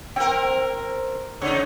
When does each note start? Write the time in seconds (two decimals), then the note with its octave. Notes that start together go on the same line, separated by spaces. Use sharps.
0.16 C4 A#4 G5
1.42 C#3 D#4 C#5